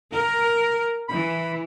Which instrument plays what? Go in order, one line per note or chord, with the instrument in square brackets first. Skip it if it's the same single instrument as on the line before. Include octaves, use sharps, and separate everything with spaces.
[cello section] A#4
[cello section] E3 [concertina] B5